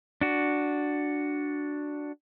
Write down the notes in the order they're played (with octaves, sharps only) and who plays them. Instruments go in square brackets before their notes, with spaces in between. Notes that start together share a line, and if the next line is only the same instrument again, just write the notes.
[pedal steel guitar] D4 F#4